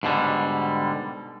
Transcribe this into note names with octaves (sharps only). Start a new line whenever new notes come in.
G#2 B2 D3 G3